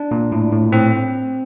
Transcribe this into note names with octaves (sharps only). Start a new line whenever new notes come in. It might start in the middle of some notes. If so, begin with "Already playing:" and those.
Already playing: D4
A#2
A2
A2
A2 C4